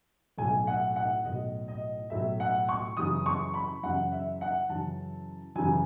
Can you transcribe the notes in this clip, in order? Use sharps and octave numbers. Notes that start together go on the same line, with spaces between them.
B1 A2 F#3 G#5
F#5
F#5
B1 A2 F#3 D#5
D#5
B1 A2 F#3 E5
F#5
C#6
F#2 C#3 E3 D#6
C#6
B5
F#2 C#3 E3 F#5
E5
F#5
F#2 C#3 E3 A5
F#2 C#3 E3 G#5